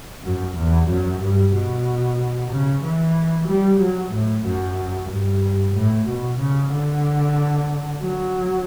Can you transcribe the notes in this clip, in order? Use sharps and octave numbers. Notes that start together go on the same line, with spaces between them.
F#2
E2
F#2
G2
B2
C#3
E3
G3
F#3
A2
F#2
G2
A2
B2
C#3
D3
F#3